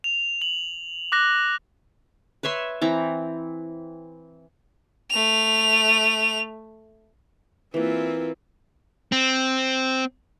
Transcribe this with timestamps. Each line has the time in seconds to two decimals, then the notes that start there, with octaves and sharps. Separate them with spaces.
0.04 F7
0.42 F#7
1.12 D6 F#6 A#6
2.43 B4 C#5 E5 C6
2.81 E3 C4 A#5
5.11 A3 F7
7.74 E3 A#3 C4 E4 F4
9.12 C4